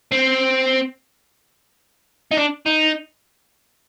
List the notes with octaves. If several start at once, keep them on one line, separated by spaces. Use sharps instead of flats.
C4
D#4
D4
D#4